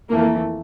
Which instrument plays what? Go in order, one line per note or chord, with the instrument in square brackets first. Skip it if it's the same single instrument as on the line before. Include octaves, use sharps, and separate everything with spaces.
[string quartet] F2 E3 A3 [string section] A#3